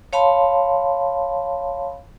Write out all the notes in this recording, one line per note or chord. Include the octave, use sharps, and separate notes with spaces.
C#5 F5 A5 B5 C6